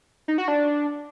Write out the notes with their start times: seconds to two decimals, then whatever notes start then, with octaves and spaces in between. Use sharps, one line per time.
0.28 D#4
0.38 F#4
0.48 D4